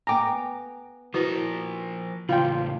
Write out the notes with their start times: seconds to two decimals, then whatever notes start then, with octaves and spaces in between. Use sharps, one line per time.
0.07 B3 G5 G#5 A#5 D6
1.14 F3 E4 F#4 A#4 B4
2.29 E2 A2 C#3 F4 G5